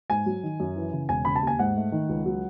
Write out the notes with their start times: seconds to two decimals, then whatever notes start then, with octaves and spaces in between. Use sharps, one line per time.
0.10 G#2 G#5
0.26 F#3
0.43 D#3
0.60 F#2
0.76 E3
0.93 C#3
1.09 E1 G#5
1.25 C#3 B5
1.36 A5
1.43 D#2 G#5
1.59 G#2 F#5
1.76 A3
1.92 D#3
2.09 C#2
2.26 F#3